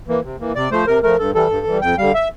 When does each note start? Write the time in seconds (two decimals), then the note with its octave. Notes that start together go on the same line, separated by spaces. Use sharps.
0.08 E3 A#3
0.24 C3
0.40 E3 A#3
0.55 C3 D5
0.72 F3 A3 C5
0.87 C3 A#4
1.03 F3 A3 A#4
1.19 G2 A4
1.35 E3 G3 A4
1.50 G2
1.66 E3 G3
1.82 F2 G5
1.98 D3 G3 F5
2.14 E5